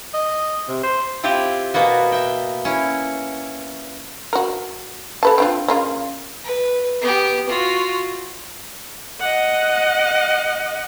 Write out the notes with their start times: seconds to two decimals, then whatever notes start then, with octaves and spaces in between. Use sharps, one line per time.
0.14 D#5
0.68 C3
0.84 C5
1.23 C4 E4 F4 G4
1.74 B2 A#3 B3 F#4
2.12 E5 G5
2.65 C#4 E4
4.33 F#4 A#4
5.23 A4 B4 A5
5.38 C4 D4 F4
5.68 C#3 A#3 F4
6.44 B4
7.01 B3 G4
7.49 F4 F#4
9.20 D#5 F#5